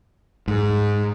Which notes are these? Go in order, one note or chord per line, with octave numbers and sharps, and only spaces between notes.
G#2